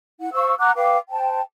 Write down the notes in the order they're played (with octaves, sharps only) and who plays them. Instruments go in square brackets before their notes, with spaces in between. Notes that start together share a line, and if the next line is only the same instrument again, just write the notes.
[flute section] E4 F#5
C5 F5 C#6 E6
F#5 A#5 D6 F#6
B4 F5 G5 D6
C5 G5 A5